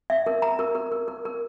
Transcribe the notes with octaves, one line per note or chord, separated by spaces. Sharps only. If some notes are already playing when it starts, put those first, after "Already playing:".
E5
A#4
A#5
A#4
A#4
A#4
A#4
A#4